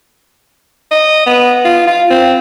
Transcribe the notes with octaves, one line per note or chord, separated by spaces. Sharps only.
D#5
B3
F4
F4
C4